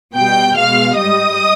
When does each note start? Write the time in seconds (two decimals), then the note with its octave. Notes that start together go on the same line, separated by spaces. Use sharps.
0.14 B2 G3 G5 G6
0.56 B2 G#3 F5 F6
0.96 G#2 G3 D#5 D#6